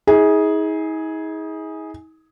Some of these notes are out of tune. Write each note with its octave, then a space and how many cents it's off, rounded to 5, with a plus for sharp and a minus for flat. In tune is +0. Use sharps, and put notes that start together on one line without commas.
D#4 +45 G#4 +0